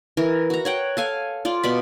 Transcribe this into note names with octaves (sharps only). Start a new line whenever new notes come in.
E3 A#4
F#4 A#5
C#5 F#5 G5
A4 F5 G#5
F4 D5
B2 D5 B5